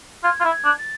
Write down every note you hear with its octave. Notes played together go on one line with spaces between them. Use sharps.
F4 G#6
F4
E4
G#6
D4
A6